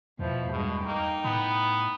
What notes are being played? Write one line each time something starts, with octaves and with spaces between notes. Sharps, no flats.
E2 B2 F3 E4
G2 B2 G#3
A#3 D#4 G5
A2 B3